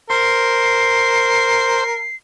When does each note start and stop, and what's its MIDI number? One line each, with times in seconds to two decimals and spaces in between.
0.10 2.02 70
0.10 1.84 72
0.10 2.16 96